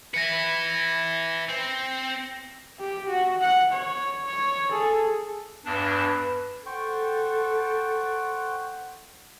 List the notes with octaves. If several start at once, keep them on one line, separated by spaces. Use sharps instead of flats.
E4 B4 A#6 C#7
C4
G4
F#4 F#5
F#5
C#5
C#5
G#4 A4
E2 G2 D4 B4
A4 C5 F#5 G5 C#6